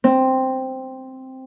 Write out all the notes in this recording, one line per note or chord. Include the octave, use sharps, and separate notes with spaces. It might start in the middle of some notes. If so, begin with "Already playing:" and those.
C4